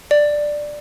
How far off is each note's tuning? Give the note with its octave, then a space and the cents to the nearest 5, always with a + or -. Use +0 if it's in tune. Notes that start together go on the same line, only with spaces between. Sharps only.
D5 +10